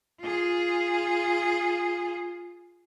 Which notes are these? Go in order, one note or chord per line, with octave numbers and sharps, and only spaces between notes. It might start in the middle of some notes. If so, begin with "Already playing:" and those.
F4 G#4